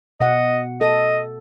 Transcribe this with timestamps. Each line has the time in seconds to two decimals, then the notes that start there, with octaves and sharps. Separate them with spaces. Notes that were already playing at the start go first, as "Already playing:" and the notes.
0.20 B2 D#5 F#5
0.81 A4 D#5